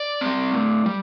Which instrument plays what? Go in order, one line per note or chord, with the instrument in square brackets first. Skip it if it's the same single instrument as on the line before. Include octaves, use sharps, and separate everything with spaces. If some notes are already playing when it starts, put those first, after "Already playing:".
Already playing: [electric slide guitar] D5
G3 C4
A2
G3